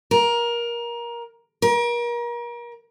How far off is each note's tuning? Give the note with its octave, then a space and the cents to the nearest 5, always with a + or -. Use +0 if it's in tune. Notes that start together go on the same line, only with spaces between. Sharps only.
A#4 +20
A#4 +35